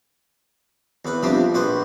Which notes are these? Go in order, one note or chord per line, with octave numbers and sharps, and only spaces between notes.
E2 B4
C3 F3 G3 D4
A#1 B4 C5